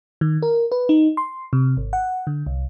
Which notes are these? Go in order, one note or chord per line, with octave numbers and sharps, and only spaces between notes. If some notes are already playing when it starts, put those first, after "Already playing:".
D#3
A#4
B4
D#4
C6
C3
G#1
F#5
D3
C2